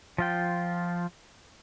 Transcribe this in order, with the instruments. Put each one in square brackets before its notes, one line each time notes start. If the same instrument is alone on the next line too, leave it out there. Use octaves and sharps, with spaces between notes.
[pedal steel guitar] F3 F4 G5